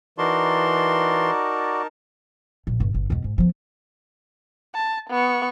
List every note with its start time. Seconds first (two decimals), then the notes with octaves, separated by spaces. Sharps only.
0.18 E3 D#4 F#4 A#4 D5 A5 C6
2.67 A#1
2.80 G1
2.94 G1
3.10 E2 B2
3.24 G#2
3.38 F3 B3
4.75 A5
5.10 B3 C#6